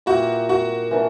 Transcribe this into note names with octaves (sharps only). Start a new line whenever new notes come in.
A#2 A#3 E4 F#4 G4
F#4
E3 A#3 D4